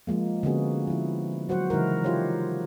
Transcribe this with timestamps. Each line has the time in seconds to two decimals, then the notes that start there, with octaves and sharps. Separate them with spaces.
0.07 F3 G#3 A#3
0.43 D3 A#3 B3 C#4 F#4 G#4
0.87 F3 E4
1.49 F#3 F#4 C5 F#5
1.70 C#3 E3 G#3 D#4 E4 A#4
2.04 D#4 F4 G4 C5 C#5